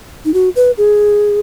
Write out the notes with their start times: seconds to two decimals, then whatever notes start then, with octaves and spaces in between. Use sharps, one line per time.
0.25 D#4
0.34 F#4
0.56 B4
0.78 G#4